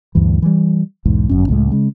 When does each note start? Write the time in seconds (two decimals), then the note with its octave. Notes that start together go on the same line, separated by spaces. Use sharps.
0.15 D2 G2 E3
0.42 E3 G3
1.05 B1 E2 G#2
1.29 G1 F#2 C#4
1.48 C#2 A2 G#3
1.71 C#3 G#3